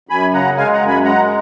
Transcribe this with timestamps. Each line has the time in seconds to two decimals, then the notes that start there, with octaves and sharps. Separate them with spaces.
0.09 F#2 G#5 B5
0.33 C#3 F#5 A#5
0.57 G#3 F5 G#5
0.73 F#5 A#5
0.81 F#2
0.88 G#5 B5
1.04 G#3 F#5 A#5